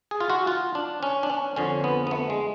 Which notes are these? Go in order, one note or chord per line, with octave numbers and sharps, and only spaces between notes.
G#4
F4
F#4
F4
D4
C#4
D4
C#4
F2 D3 C#4
B3
B3
A3
G#3